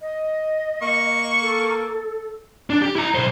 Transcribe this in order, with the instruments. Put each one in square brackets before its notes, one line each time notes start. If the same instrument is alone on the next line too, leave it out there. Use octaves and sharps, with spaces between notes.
[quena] D#5
[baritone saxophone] A#3 [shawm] C#6
[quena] A4
[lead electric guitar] D4
G4
E4 A#5
B1 C5